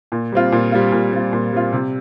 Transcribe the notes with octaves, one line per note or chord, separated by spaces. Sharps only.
A#2
G3 C4 F4
A#2
G3 C4 F4
A#2
G3 C4 F4
A#2
G3 C4 F4
C3